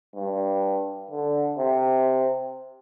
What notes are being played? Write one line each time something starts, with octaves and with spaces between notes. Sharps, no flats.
G2
D3
C3